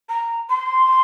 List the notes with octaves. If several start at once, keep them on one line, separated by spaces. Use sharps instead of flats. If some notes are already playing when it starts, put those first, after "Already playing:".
A#5
C6